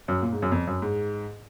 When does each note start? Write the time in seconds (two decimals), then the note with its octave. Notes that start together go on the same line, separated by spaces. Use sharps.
0.08 F#2
0.22 A#2
0.32 G#2
0.42 F#2
0.52 F2
0.67 F#2
0.82 G#2